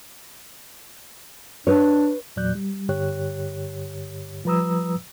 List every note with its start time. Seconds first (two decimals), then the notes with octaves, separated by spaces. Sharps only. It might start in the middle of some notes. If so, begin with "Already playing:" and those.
1.67 D4 B4 C#5
2.36 E2 A#2 F#3 D5 F#6 G6
2.55 G3
2.89 G2 D3 G4 C#5 F#6
4.45 F3 G3 B4 A#5 D#6 E6